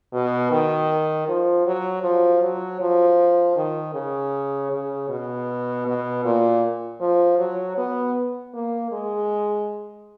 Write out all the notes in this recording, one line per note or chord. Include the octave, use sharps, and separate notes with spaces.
B2
D#3
F3
F#3
F3
F#3
F3
D#3
C#3
C#3
B2
B2
A#2
F3
F#3
B3
A#3
G#3